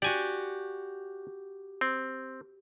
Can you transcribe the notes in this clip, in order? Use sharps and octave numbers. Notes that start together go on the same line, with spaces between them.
F#4 G4 D5 G#5
C4